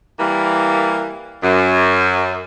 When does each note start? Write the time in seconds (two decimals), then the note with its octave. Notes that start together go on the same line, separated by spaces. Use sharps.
0.19 E3 G3 A#3
1.43 F#2